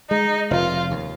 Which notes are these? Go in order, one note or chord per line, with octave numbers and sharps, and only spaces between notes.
G#3 D#4
F1 F4
D#2